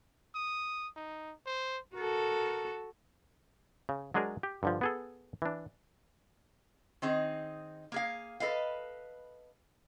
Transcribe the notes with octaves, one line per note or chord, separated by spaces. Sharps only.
D#6
D#4
C5
F#4 A4 A#4
C#3
F#3 G#3 D4 G#4 A#4
G4
G2 D3 F3
B3 G#4 A4
E3 D4
D#3 C4 D#4 G#4
A#3 G#4 F5
A4 B4 D#5 F5